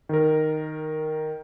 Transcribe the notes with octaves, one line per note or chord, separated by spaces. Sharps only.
D#3 A#4